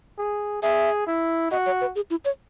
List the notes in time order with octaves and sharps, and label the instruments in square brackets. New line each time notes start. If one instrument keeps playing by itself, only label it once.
[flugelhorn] G#4
[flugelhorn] G#4 [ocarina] E5
[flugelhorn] E4
[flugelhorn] F#4 [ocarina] D#5
[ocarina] C#5
B4
G#4
E4
C#5